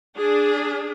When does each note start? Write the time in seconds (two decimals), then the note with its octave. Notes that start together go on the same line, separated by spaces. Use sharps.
0.16 D4 G#4